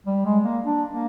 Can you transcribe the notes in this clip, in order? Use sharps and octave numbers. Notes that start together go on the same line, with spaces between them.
G3
G#3
A#3
D4
A#3